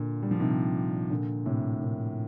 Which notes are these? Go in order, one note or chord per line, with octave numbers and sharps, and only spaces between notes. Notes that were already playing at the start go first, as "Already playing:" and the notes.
Already playing: A#2 D3
G3
F3
C3 D#3
A#2 D3
A2 C3
A#2 D3